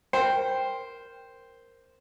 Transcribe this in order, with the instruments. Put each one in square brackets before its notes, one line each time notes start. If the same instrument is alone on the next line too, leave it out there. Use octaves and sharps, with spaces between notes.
[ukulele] A#4 G5 [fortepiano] C5